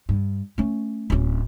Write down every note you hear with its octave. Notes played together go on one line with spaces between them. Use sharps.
G2
A3 C#4
D1 C#4